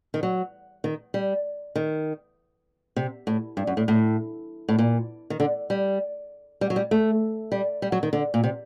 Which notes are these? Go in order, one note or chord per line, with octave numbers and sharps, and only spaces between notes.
D#3
F#3
D#3
G3
D#3
C3
A2
G2
F#2
A2
A2
A2
A#2
D#3
D3
G3
G3
F#3
G3
A3
G3
G3
F#3
D#3
D3
A#2
C3